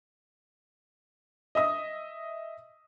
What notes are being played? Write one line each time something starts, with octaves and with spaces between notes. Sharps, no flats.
D#5 E5 D#6